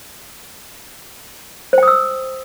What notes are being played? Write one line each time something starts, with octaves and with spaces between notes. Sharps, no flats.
C5 G5 D#6 E6